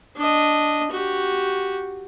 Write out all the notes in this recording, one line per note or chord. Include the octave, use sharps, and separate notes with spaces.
D4 D#5
F#4 G4